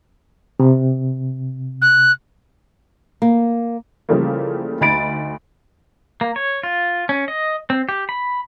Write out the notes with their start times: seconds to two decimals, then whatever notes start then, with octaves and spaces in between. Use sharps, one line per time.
0.60 C3
1.81 F#6
3.22 A#3
4.09 C#3 E3 F3 G3 A3 A#3
4.81 D2 D#4 B5 A6 D7
6.21 A#3
6.36 C#5
6.63 F4
7.09 C#4
7.28 D#5
7.70 C4
7.89 G4
8.09 B5